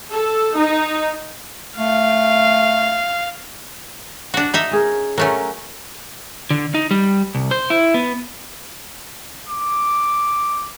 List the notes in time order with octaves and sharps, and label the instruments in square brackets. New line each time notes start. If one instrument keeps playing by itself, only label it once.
[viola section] A4
D#4
[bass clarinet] A3 [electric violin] F5
[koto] D4 F#4
D#4 D#5 E5
[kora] C#4 G#4 A#4
[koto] F#3 A3 C#4 [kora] A#4 F#5
[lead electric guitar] D3
D#4
G3
C2
C5
E4
B3
[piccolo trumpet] D6